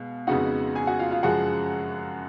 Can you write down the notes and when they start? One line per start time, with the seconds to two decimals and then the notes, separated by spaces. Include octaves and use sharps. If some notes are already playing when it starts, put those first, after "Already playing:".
Already playing: B2 G#3 F5
0.27 F2 C#3 G#3 B3 D#4 F#4 F#5
0.75 G#4 G#5
0.87 F#4 F#5
0.99 F4 F5
1.11 F4 F5
1.23 F#2 C#3 F3 G#3 F#4 F#5